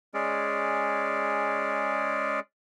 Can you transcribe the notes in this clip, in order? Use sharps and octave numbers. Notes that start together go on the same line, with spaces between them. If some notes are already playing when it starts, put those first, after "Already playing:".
G#3 C#4 G#4 D5